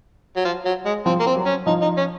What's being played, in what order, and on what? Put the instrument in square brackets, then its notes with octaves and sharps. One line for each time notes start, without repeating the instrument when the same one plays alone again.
[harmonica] F#3
F3
F#3
G#3
[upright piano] F3 [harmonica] C4
[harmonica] A#3
C4
[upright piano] F#3
[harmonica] C#4
[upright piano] F3 [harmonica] D#4
[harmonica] D#4
C#4